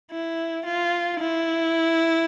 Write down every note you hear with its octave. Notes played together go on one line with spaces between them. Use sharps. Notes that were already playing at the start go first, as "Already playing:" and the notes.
E4
F4
E4